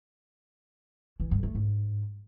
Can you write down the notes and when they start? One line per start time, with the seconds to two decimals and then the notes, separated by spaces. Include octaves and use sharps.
1.20 E3
1.31 G2
1.43 A3
1.55 G#2